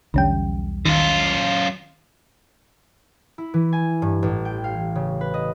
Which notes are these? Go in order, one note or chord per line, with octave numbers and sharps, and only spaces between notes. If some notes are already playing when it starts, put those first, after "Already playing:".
B1 E2 D3 G3 C#4 G5
F#2 D#3 F4
E4
E3
G#5
G2
A1
G5
F5
C#3
B4
D#5